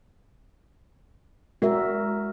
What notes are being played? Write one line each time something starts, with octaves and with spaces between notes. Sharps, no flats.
G#3 F#4 A#4 E5